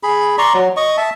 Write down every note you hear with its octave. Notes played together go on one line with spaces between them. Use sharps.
G#4 B5
D5 A#5 C6 C#6
F#3
D#5 C#6
E5 A5